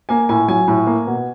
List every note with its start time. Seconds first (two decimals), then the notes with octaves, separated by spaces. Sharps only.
0.09 A#3 G#5
0.29 A2 G#5
0.48 F#3 G#5
0.68 A2
0.86 A#3
1.07 B2